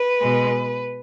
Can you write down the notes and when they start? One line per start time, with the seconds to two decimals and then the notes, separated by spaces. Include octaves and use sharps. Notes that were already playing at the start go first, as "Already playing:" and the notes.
Already playing: B4
0.21 B2 G#3